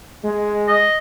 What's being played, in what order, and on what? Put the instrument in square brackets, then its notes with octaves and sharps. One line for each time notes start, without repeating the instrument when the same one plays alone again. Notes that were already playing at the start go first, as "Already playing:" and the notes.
[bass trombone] G#3
[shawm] D#5